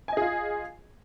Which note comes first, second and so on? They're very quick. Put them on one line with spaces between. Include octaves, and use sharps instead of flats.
G#5 D#5 G#4 F4